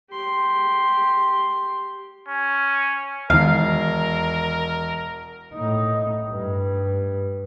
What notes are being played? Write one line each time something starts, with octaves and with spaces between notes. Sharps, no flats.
G4 C6
C#4
E1 E2 D#3 A#4 F5
A2 D#4
G2